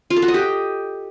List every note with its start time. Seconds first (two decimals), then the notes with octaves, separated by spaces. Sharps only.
0.10 F4
0.16 A4
0.22 F#4
0.28 D#5
0.34 G4